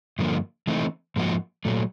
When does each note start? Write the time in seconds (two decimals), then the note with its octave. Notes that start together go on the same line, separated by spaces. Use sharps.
0.19 G2 D3 F3 A#3
0.67 E3 A3 C4 D#4
1.16 G#2 F3 A#3 D#4 F#4
1.65 A#2 F#3 A3